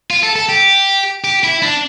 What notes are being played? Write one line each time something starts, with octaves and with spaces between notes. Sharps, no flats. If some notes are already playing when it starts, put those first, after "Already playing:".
F4
A4
A4
G4
G4
E4
D4